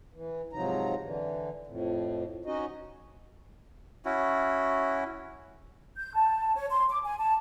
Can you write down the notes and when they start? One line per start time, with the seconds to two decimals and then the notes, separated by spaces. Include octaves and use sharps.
0.14 E3
0.53 G#2 C3 F3 F#3 D#4 A#5
1.03 D3 E3
1.67 F2 A2
2.45 C#4 D#4 F#4 D#5
4.05 C#4 E4 F#4
5.96 G6
6.15 A5
6.55 C#5
6.71 C6
6.89 D6
7.04 G#5
7.19 A5